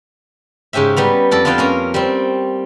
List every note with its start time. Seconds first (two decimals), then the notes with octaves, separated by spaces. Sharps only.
0.73 G#2 C#3 C#4 G4 E5
0.97 G3 B3 A#5
1.31 F2 A4 D5
1.45 B3 D4 F4 D5 F5 G5
1.58 A#3 C#4 A#4
1.94 G3 C4